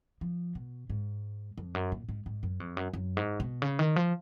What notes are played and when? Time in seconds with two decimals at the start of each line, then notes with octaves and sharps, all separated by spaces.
0.21 F3
0.55 B2
0.90 G#2
1.58 F2
1.75 F#2
1.92 A#2
2.09 G#2
2.26 G#2
2.43 F#2
2.60 F2
2.77 F#2
2.93 F#2
3.17 G#2
3.40 B2
3.62 C#3
3.79 D#3
3.96 F3